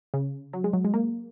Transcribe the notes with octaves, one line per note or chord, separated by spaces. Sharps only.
C#3
F#3
G#3
F#3
G#3
A#3